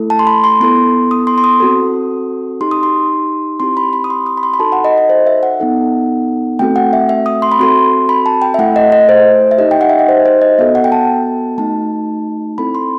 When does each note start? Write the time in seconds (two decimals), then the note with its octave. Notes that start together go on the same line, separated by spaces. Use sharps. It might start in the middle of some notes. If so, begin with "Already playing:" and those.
Already playing: A3 E4 A4
0.10 A5
0.19 C6
0.27 B5
0.44 C6
0.60 B3 E4 A4 C6
1.11 D#6
1.27 C6
1.38 C6
1.44 D#6
1.60 C4 F#4 A4
2.61 D#4 G4 C6
2.71 D#6
2.83 C6
3.60 C4 E4 G4 C6
3.77 B5
3.93 B5
4.04 D#6
4.10 C6
4.26 D#6
4.37 B5
4.43 C6
4.54 B5
4.59 D#4 F#4 A4 A5
4.72 F#5
4.85 D#5
4.97 D#5
5.10 C5
5.27 E5
5.43 F#5
5.60 B3 D#4 A4
6.59 A3 C4 F#4 A4 G5
6.76 F#5
6.93 E5
7.09 E5
7.26 D#6
7.42 C6
7.52 B5
7.59 C4 F#4 A4 C6
8.09 B5
8.26 A5
8.42 G5
8.54 E5
8.58 A3 E4 A4 F#5
8.76 D#5
8.92 D#5
9.09 C5
9.51 E5
9.58 D#4 G4 D#5
9.71 G5
9.81 F#5
9.89 E5
9.99 D#5
10.09 C5
10.26 C5
10.42 D#5
10.59 B3 F#4 A4 E5
10.75 F#5
10.84 G5
10.92 A5
11.58 A3 D#4 F#4 A5
12.58 C4 E4 A4 B5
12.75 C6